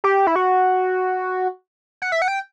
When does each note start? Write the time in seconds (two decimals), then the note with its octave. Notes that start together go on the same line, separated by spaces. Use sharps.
0.04 G4
0.27 E4
0.36 F#4
2.02 F#5
2.12 E5
2.22 F#5
2.28 G5